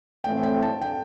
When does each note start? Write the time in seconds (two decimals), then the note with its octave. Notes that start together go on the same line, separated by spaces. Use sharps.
0.24 A2 E3 A3 C4 G5
0.43 G5
0.62 A5
0.81 G5